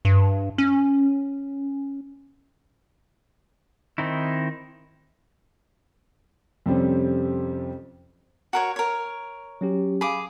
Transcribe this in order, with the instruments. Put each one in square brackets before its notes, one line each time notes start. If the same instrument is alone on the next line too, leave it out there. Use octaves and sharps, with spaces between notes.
[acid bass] G2
C#4
[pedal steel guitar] D#3 C4 D#4 E4
[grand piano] F2 C3 G3 C4 C#4
[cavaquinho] F#4 A#4 C#5
A#4 C#5
[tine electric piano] F#3 C#4 G4
[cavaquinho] G#4 D6 [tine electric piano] F5 B5